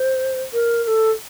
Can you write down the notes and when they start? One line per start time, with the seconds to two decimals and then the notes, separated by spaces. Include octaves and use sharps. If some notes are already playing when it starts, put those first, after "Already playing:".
Already playing: C5
0.53 A#4
0.84 A#4
0.88 A4